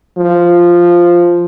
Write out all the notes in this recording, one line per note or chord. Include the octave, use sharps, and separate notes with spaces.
F3